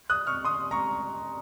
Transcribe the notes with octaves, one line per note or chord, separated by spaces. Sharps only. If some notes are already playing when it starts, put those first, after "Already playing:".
D#6 F#6
C#6 F6
C6 D#6
A#5 C#6